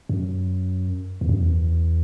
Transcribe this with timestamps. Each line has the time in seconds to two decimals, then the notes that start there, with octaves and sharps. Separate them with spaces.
0.09 F#2
1.21 E2
1.29 F#2
1.38 E2